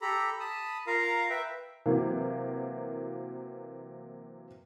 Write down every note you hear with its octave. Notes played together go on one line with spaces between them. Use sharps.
G4 A4 A#5 B5
A5 B5 D#6
F4 A#4 F5 A#5
B4 E5 G5
C3 E3 F#3 A#3